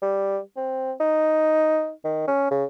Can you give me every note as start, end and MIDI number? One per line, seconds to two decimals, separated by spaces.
0.02 0.39 55
0.57 0.92 60
1.00 1.91 63
2.05 2.26 51
2.28 2.50 61
2.51 2.65 49